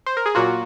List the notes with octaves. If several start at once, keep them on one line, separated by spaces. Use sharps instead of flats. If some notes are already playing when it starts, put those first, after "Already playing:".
C5
A#4
G#4
A#2 F#3 A#3 F4 F#4